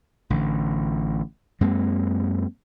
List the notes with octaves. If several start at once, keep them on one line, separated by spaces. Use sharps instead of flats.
A1 D3
F#2 G#3 A#3 C4